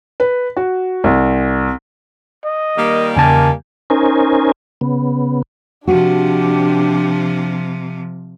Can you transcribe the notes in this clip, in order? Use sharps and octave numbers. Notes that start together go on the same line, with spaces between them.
B4
F#4
C2
D#5
D#3 G3 A#3
E2 C#3 G#5 A5
C#4 D#4 A#4 C5 G#5
C#3 B3
C3 F3 D4 F#4 G4